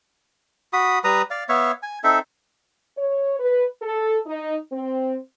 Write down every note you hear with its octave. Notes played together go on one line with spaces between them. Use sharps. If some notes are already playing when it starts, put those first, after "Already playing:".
F#4 B5 D#6
G3 B4 A#5 D#6
D5 F5
B3 C#5 E5 F5
G#5
C4 D#4 A4 E5
C#5
B4
A4
D#4
C4